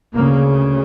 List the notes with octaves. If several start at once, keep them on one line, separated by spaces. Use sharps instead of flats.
D2 C#3 A#3